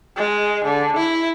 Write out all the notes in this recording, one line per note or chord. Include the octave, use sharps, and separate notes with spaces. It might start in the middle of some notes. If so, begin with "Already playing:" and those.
G#3
D3
E4